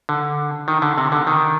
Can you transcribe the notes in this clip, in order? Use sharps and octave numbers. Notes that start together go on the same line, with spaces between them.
D3
D#3
D3
C3
D3
D#3